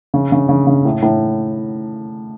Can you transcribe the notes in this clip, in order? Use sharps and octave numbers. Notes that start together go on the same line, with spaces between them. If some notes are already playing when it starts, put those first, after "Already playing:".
C#3
C#3
C#3
C#3
A2
A2